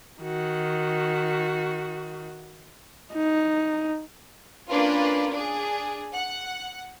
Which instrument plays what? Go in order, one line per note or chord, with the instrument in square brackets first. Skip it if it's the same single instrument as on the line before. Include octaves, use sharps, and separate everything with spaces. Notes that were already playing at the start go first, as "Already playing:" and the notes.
[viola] D#3 F#4
[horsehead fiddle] D#4
[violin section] A#3 C#4 D4 F4 B4
D4 G#4
F#5